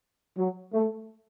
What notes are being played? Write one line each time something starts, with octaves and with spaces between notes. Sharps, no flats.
F#3
A3